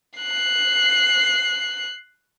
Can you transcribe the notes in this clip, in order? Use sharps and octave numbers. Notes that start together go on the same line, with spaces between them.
F#6 C7